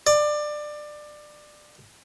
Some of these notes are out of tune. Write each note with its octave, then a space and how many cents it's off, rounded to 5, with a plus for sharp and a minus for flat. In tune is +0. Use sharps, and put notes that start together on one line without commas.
D5 +20